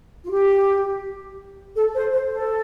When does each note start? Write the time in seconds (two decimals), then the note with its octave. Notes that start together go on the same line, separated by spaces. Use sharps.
0.23 F4
0.31 G4
1.75 A4
1.94 C5
2.11 C5
2.30 A4